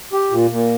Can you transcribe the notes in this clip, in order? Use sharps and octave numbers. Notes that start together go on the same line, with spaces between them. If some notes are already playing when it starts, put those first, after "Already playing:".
G4
A#2
A#2